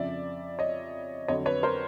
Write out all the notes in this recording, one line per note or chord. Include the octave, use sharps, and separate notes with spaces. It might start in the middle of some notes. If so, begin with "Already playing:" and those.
Already playing: F2 C#3 F3 D5 E5
C#5 D#5
F2 D3 F#3 C#5 D#5
B4 C#5
A#4 C5